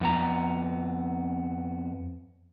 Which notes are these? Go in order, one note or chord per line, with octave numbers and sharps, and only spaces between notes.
F2 B3 A#5